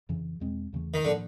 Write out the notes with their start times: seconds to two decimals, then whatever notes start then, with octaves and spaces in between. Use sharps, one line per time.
0.09 F2 C#3 E3
0.40 E2 B2 G#3 C4
0.73 E2 C#3 E3 A3
0.94 D#3
1.05 A2 D3 F3 A#3 D4